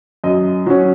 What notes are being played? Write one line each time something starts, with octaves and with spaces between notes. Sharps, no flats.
F#2 D#5
F#3 C#4